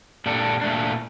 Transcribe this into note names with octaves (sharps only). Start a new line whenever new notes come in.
A#2 G3 D4 A4
A#2 A3 D4